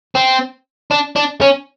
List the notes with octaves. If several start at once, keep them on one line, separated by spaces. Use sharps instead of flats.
C4
D4
D4
C#4